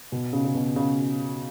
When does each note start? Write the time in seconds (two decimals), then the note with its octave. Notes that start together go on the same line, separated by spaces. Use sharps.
0.12 B2
0.33 C#3
0.44 C#3
0.55 B2
0.76 C#3